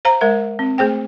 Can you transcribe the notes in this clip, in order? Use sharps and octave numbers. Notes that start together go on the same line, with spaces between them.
C5 F5 A#5
G#3 A#4 E5
C4
A3 G#4 C5 G5